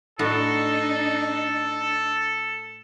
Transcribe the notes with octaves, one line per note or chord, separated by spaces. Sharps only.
A2 D4 D#4 F#4 A4